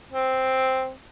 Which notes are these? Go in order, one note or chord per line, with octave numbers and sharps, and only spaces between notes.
C4